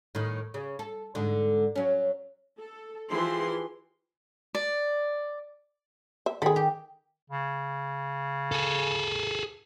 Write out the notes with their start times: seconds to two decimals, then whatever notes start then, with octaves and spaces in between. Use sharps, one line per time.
0.15 A2 D#3
0.54 C#3
0.79 A4
1.15 G#2 D3
1.75 F#3 C#4
2.59 A4
3.10 E3 F3 E4 G4 G#4 C6
4.55 D5
6.26 E5
6.42 D#3 G#4 A4 B5
6.56 G4
7.30 C#3
8.52 G#4 A4